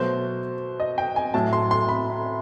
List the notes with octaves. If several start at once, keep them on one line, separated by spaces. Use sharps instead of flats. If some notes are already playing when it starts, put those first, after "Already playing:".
Already playing: B2 F#3 A3 C5
D#5
G5
G#5
A2 F#3 A3 A5
C6
C6
B5